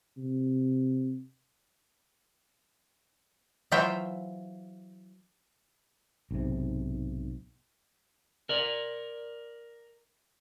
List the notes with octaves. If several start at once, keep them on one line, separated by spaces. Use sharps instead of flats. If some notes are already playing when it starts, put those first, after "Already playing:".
C3
E3 F#3 F4 C5 E5 G5
B1 G#2 C3
A#4 D5